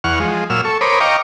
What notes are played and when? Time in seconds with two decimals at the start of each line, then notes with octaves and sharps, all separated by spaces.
0.04 E2 F#5 C#6 F6
0.20 F3 G#3
0.50 A#2 F#3 E6 F6
0.65 A4 C#6
0.81 A#4 C5 C#5 B5 D6 D#6
1.00 D#5 F5 G5 A#5 C#6 D6